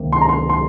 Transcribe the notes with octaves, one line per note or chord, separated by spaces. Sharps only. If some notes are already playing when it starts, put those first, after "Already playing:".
Already playing: C#2 C3 D#3 A#3
C6
A#5
C6
C6